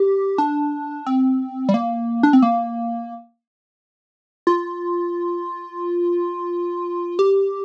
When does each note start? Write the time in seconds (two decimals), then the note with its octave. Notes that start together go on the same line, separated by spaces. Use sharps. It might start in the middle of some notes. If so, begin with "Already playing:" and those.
Already playing: G4
0.38 D4
1.06 C4
1.69 G3
1.74 A#3
2.23 D4
2.33 C4
2.42 A#3
4.47 F4
7.19 G4